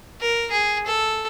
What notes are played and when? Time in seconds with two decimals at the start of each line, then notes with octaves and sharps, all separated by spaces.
0.21 A#4
0.51 G#4
0.87 A4